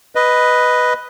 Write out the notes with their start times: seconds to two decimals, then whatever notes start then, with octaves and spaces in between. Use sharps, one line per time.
0.15 B4 D#5